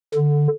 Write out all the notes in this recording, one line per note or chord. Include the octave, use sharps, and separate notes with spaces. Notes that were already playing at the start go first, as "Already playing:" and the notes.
D3